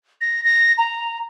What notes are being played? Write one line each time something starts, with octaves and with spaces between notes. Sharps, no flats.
A#6
A#6
A#5